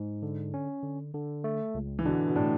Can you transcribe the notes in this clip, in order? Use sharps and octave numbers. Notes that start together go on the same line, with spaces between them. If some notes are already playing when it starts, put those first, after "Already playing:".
Already playing: G#2
D3
C#4
D3
D3
A3
C#2
E3
B2 D3 D4
B2
A2 D4